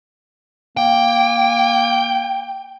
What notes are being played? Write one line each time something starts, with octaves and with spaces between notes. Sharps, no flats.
A#3 G5